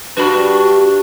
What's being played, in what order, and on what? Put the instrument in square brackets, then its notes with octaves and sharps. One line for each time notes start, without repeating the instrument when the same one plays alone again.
[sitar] G2 [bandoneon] D4 [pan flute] F#4 [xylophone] B4 B5